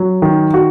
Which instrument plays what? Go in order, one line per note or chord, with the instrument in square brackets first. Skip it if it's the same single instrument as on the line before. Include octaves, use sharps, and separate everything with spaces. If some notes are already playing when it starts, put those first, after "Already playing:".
Already playing: [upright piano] F#3
D#3
F#4